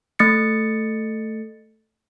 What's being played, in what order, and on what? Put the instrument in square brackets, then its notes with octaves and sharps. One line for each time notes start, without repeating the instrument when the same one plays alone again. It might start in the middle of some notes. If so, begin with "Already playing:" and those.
[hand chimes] A3 A6 C#7